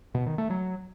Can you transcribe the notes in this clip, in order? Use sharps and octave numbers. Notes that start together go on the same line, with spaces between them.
B2
D#3
A3
F#3